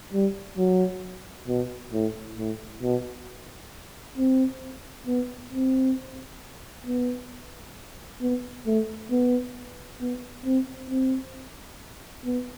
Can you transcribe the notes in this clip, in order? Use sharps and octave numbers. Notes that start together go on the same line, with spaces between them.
G3
F#3
B2
A2
A2
B2
C4
B3
C4
B3
B3
A3
B3
B3
C4
C4
B3